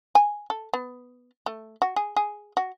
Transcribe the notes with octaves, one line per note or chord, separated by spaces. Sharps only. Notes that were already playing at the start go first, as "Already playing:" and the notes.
G#5
A4
B3
A3
F#4
G#4
G#4
F#4